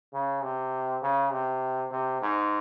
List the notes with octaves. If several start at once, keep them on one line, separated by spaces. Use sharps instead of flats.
C#3
C3
C#3
C3
C3
G#2